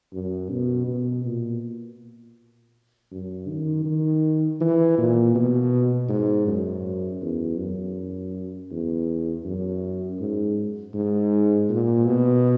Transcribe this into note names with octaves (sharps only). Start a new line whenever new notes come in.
F#2
B2
B2
A#2
F#2
D#3
D#3
E3
A#2
B2
G#2
F#2
E2
F#2
E2
F#2
G#2
G#2
A#2
B2